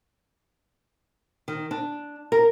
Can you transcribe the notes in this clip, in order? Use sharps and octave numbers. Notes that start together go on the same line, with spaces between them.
D#3
D4
A#4